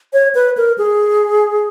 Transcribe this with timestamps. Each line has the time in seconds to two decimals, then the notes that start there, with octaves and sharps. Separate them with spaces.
0.13 C#5
0.35 B4
0.57 A#4
0.78 G#4